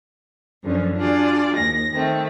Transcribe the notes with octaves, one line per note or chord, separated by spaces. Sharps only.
F#2 D3 F3 C#4
D4 F4 F#4 G#4 D5
D#2 A#6
D#3 A3 C4